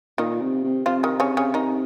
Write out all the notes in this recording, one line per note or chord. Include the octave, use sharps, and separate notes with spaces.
A#2 D#3 D#4
C3
C3
C3 F3 F4
D#3 D#4
C#3 C#4
C#3 C#4
D#3 D#4